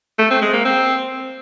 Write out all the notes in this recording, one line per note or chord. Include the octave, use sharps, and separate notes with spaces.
A3
C4
G#3
A#3
C4